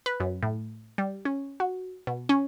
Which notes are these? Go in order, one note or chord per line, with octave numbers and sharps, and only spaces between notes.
B4
F#2
A2
G3
C#4
F#4
B2
C#4